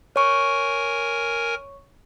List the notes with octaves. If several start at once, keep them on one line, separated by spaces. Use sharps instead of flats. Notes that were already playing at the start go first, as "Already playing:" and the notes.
A#4 C#5 G#5 C#6